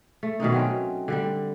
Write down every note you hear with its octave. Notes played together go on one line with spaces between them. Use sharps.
A3
B2 D#3 D4 D#4
F#3 C4 C#4
D3 G3 D4